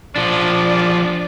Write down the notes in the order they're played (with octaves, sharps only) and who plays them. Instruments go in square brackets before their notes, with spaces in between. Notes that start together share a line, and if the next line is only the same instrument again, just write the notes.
[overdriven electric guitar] F3 D4 [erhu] D5